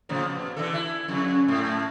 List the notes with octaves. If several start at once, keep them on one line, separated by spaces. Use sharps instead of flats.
A2 C#3 F3
B2
D3 E3 A4
E4
F2 C#3
G#2 A3